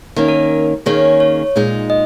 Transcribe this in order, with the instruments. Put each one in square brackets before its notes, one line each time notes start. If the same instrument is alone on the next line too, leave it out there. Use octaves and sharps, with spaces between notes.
[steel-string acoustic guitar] D#3 A#3 C#4
[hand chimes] A#4
[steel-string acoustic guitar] D#3 A#3 C#4 G#4 [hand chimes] C#5
[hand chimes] C#5
[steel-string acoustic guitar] A#2 G#3 D#4
[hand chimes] D#5